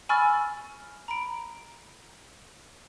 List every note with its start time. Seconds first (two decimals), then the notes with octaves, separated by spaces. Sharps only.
0.09 G#5 B5 C#6 E6 F6 A6
1.08 A#5 B5 D7